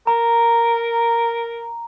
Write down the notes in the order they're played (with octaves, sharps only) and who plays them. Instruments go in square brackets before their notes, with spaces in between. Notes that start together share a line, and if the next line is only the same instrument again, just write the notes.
[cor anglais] A#4 [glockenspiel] A#5